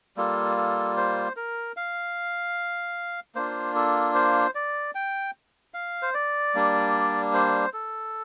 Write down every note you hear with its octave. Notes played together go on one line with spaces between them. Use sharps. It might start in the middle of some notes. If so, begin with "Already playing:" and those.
G3 A#3 F4 A4
A4
C5
A#4
F5
A#3 D4 F4 C5
A4
C5
D5
G5
F5
C5
D5
G3 A#3 D4
C5
A4